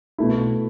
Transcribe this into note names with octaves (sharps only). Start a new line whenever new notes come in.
B2 A3 E4